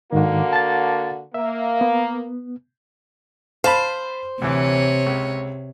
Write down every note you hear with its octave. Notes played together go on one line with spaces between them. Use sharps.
G#2 D3 D#3 A#3 F#4
A5 A6
A#3 E5
B3
C5 F5 A5 B5
D2 C3 E3 C#5
C#2